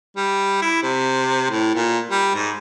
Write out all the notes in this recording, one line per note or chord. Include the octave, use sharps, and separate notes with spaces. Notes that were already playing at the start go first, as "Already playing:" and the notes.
G3
E4
C3
A2
A#2
G3
G#2